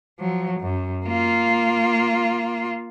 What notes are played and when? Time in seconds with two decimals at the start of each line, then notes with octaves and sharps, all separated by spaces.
0.19 F3 F#3
0.60 F#2
1.05 A#3 F4